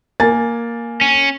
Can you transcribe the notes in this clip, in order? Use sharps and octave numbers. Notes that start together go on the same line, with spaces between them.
A#3 G#5 A6
C#4